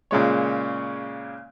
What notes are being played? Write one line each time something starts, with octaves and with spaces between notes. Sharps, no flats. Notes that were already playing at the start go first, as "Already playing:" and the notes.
A#2 C#3 G#3 C#5